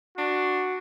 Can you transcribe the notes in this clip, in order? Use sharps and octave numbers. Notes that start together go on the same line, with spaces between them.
D4 F#4